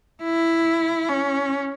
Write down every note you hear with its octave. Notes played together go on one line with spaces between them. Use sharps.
E4
C#4